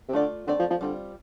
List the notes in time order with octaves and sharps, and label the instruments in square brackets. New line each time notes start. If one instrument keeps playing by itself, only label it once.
[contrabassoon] C3
[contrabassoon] D3 [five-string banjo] A3 F4 D5
[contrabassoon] D3 [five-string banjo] A3 C4 A4 D5
[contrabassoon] F3
F3
[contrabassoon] D3 [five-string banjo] G3 C4 F4